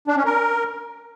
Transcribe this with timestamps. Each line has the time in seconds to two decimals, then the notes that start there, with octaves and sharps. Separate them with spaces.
0.08 D4
0.16 C#4
0.25 A#4